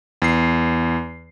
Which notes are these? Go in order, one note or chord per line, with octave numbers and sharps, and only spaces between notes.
E2 C7